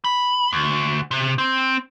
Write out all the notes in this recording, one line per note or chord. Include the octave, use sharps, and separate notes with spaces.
B5
D2
C3
C4